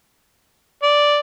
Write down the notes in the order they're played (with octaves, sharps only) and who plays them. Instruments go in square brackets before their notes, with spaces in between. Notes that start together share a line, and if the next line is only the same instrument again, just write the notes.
[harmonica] D5